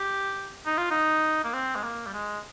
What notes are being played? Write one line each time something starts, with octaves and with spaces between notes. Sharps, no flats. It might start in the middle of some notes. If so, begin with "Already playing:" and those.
Already playing: G4
D#4
F4
D#4
A#3
C4
G#3
A#3
G3
G#3